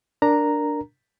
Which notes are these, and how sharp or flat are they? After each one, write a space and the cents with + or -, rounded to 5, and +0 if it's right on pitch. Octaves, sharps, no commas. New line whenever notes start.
D4 +0 A#4 +0 A#5 +0